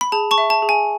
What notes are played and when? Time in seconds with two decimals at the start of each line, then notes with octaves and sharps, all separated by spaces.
0.01 B5
0.12 G#4 A5
0.31 A5 C#6
0.38 E5
0.50 A5
0.62 G#4
0.69 G#5